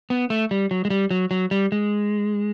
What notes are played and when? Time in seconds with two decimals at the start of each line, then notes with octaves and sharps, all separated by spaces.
0.10 B3
0.30 A3
0.51 G3
0.71 F#3
0.85 G#3
0.90 G3
1.11 F#3
1.31 F#3
1.51 G3
1.72 G#3